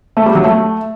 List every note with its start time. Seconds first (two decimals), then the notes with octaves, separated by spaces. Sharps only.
0.17 A3
0.26 G3
0.35 F#3
0.44 A3